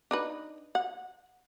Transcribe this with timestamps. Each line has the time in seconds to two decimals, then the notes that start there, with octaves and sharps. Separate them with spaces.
0.11 D4 D#4 B4
0.75 F#5